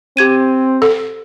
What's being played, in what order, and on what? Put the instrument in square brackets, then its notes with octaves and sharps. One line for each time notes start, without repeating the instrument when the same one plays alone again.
[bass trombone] C4 [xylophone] G4 G#6 D#7
[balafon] A4